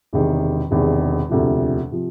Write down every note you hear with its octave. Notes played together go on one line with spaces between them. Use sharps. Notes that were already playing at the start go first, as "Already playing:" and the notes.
E1 E2 C3 D#3
E1 E2 C3 D#3
E1 D2 C3 F3
C3 F3